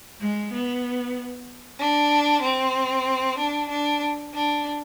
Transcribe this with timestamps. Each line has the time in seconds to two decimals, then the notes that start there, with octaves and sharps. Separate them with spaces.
0.21 G#3
0.52 B3
1.78 D4
2.42 C4
3.37 D4
3.69 D4
4.32 D4